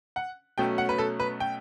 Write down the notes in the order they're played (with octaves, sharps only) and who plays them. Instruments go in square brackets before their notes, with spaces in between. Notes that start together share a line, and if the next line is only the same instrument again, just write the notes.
[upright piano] F#5
B2 F#3 A3 C#4 G5
F#5
B4
A4
B4
G5